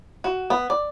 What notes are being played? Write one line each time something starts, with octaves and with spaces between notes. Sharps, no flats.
F#4
B3
D5